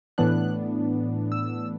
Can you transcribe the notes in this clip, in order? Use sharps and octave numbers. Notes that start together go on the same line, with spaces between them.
A2 E3 B3 D4 F#6
E6